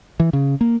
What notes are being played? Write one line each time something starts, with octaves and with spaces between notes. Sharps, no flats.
E3
C#3
A#3